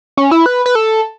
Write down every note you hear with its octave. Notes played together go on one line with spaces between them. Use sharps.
C#4
E4
B4
B4
A4